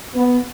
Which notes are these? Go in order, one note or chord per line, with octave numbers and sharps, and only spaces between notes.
B3